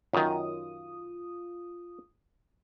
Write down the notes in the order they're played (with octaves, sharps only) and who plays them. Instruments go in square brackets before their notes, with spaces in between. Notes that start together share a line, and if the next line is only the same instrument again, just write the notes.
[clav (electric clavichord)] F#2 D#3 [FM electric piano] F4 D#6